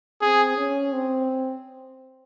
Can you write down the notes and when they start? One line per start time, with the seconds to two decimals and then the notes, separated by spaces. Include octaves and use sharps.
0.21 C4 G#4
0.57 C#4
0.93 C4